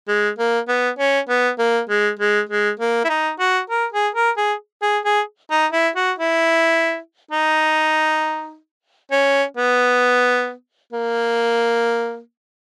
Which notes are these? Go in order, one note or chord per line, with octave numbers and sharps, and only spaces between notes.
G#3
A#3
B3
C#4
B3
A#3
G#3
G#3
G#3
A#3
E4
D#4
F#4
A#4
G#4
A#4
G#4
G#4
G#4
D#4
E4
F#4
E4
D#4
C#4
B3
A#3